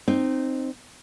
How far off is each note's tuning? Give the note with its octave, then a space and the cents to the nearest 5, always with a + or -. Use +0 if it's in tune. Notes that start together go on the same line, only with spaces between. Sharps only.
C4 +0 D#4 -20